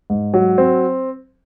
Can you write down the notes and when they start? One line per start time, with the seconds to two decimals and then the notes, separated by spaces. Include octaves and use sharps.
0.10 G#2
0.34 F#3
0.58 C4